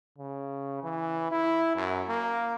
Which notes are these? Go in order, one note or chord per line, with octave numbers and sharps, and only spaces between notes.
C#3
E3
E4
F#2
A#3